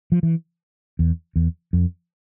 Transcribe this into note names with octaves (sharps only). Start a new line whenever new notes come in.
F3
E3
E2
E2
F2